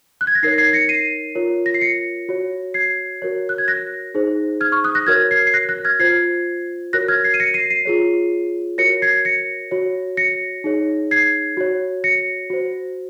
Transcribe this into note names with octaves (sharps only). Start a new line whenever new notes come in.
F#6
G#6
A#6
D#4 A#4 C#5 G#6 C7
G#6 C7
A#6 C#7
C7 D#7
F4 A#4 C#5
A#6
C7
A#6 C#7
F#4 C#5
G#6 C7
F#4 A#4 C#5
F#6
G#6
F#6 A#6
D#4 G#4 C5
F6 G#6
C#6 F6
D#6 F#6
F#6 A#6
F#4 A#4 C#5 F6 G#6
G#6 C7
C7
F#6 A#6
F#6 A#6
F6 G#6
F4 C5 G#6 C7
F#4 A#4 C#5 F#6 A#6
F6 G#6
G#6 C7
D#7
A#6 C#7
C7 D#7
C7 D#7
F4 G#4 C#5
F#4 A#4 C#5 A#6 C#7
G#6 C7
A#6 C#7
F#4 C#5
A#6 C#7
D#4 G#4 C#5
G#6 C7
F#4 C#5
A#6 C#7
F#4 C5